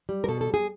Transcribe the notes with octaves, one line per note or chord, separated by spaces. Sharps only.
G3
A#4
B2 A4
A4
G3
G#4